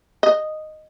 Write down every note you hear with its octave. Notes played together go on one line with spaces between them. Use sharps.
D#5